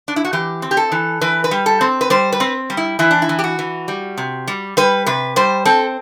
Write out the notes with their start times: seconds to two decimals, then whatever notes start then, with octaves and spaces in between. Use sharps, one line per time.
0.08 D4
0.16 E4
0.25 F#4
0.33 E3 G4
0.62 C4
0.71 G4
0.77 A4
0.92 E3
1.21 E3 B4
1.44 B4
1.51 G3
1.66 A4
1.81 C4
2.01 B4
2.10 G3 C5
2.32 B4
2.40 C4
2.70 G3
2.77 E4
2.99 E3 E4
3.11 D4
3.22 E4
3.29 E3
3.39 G4
3.44 F#4
3.59 E3
3.88 G3
4.18 C3
4.48 G3
4.77 G3 B4
5.06 C3 B4
5.36 G3 C5
5.65 C4 A4